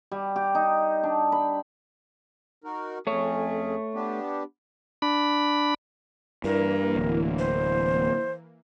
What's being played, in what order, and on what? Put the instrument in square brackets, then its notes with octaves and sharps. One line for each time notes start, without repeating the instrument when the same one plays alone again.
[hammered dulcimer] G3
G4
D#4
D4
B5
[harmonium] D#4 F#4 A#4
[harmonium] F2 C#4 G#4 [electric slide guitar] A3 C#5
[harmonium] B3 D4 G4
[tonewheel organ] D4 B5
[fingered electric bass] G2 [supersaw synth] E3 A#3 [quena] A#4
[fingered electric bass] D1
[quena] C5